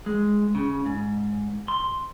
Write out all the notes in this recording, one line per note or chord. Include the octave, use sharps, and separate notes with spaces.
G#3
C#3
G#2
C6